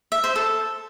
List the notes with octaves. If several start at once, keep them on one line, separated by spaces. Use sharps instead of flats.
E5
C5
A4